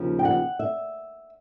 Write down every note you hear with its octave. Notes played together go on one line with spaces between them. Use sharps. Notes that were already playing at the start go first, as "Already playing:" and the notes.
Already playing: D#2 C#3 F3
G5
F#5
E5